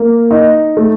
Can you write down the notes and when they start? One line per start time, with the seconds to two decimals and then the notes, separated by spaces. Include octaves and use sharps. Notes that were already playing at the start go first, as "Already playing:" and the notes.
Already playing: A#3
0.31 D#4
0.77 A3